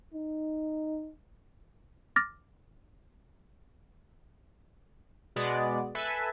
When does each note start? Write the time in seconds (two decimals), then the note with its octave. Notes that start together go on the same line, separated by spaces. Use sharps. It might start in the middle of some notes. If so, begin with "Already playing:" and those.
0.14 D#4
2.16 D6 F6 A6 A#6
5.36 B2 G#3 B3 D5
5.95 A4 B4 E5 G#5 A5